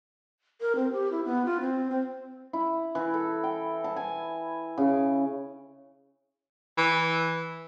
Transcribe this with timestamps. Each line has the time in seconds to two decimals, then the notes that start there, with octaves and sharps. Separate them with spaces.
0.61 A#4
0.75 C4
0.92 G4
1.12 E4
1.25 B3
1.45 F4
1.61 C4
1.90 C4
2.53 E4
2.95 E3
3.14 A4
3.44 G5
3.84 A5
3.96 G#5
4.78 C#3
6.78 E3